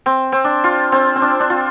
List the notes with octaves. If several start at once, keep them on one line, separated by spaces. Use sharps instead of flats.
C4
C4
D4
F4
C4
C4
D4
D4
F4